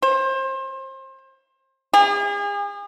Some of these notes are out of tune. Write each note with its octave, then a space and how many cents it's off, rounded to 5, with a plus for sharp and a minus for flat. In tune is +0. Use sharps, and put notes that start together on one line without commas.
C5 +30
G#4 -40